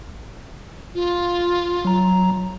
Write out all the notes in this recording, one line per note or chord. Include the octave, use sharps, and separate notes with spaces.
F4
F#3 A#5